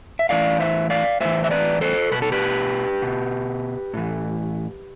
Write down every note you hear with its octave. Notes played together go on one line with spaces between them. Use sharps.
E5
A2 E3 D5 F5
C5 E5
D5 F5
A2 E3 C5 E5
E5
B4 D5
A4 C5
B2 B4
A4
G4 B4
B2
A2 E3